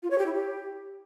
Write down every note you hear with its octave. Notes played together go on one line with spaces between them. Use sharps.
F4
C#5
G4
E4
G4